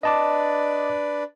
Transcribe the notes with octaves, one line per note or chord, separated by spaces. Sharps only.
D4 B4 D5 D#5 A5 D6